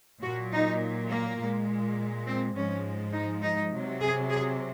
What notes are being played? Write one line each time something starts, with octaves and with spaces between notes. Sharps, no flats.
A#2 F#3 F#4
D#4
A#3
A#2 G#3
C4
G#2 F3 G#3 C#4
D#4
D#4
C3 F#3
G#4
G#4